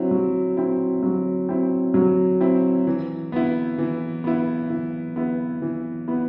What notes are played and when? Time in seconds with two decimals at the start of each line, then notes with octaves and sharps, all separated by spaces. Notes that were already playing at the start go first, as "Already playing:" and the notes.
Already playing: F#3 C4 E4
0.11 F#3
0.57 C4 E4
1.03 F#3
1.49 C4 E4
1.94 F#3
2.41 C4 E4
2.87 E3
3.32 B3 E4
3.78 E3
4.24 B3 E4
4.70 E3
5.16 B3 E4
5.62 E3
6.08 B3 E4